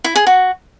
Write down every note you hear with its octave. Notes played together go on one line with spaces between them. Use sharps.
E4
G#4
F#4